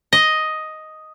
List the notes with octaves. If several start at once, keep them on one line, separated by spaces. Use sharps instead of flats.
D#5